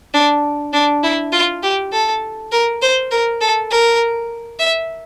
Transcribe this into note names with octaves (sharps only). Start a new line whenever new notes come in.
D4
D4
E4
F4
G4
A4
A#4
C5
A#4
A4
A#4
E5